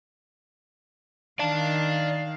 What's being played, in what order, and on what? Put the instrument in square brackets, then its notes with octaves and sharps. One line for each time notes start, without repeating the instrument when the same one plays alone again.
[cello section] D#3 F5 [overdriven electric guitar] D5 A5